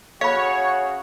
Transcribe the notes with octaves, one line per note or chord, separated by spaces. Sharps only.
C#3 F#4 C#5 F5 B5